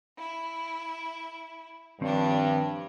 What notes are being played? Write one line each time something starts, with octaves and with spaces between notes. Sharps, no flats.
E4
G2 D#3 F3 C4 D4 C#5